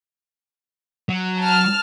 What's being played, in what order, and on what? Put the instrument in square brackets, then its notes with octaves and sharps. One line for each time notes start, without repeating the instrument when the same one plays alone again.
[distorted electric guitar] F#3
[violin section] A5 F6